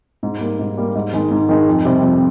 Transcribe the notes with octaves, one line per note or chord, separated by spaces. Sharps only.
G#2
G3 A#3
G#2
G3 A#3
G#2
D#3 G#3
G#2
D#3 G#3
F2
C3 G3 C4
F2